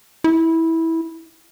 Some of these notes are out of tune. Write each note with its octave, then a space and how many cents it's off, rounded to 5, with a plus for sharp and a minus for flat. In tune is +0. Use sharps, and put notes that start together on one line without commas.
E4 -15